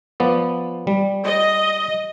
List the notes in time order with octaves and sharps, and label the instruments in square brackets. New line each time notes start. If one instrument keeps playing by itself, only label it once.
[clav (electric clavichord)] F3 B3 D5
G3
[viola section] D#5